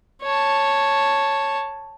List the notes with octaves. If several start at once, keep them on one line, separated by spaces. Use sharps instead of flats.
C#5 A5